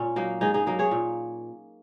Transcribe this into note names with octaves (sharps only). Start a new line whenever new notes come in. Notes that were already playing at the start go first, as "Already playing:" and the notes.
Already playing: A#2 C#4
F#3 A#3 D#4
G#2 D#4 G#4
D#4 G#4
F#3 A#3 D#4
G#4 C#5
A#2